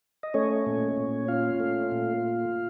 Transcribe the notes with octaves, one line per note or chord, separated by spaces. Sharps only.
D#5
A3 C#4 C#5
A#2
A#2
C#4 F4 F5
A3
A#2